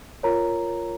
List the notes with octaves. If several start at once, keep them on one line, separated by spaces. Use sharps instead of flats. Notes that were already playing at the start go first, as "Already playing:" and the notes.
F4 A#4 C#5 A#5